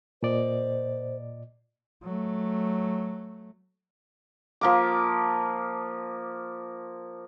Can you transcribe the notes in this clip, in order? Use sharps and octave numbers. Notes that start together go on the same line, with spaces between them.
A#2 C5 D5 D#5
F#3 A3
F3 A#3 D6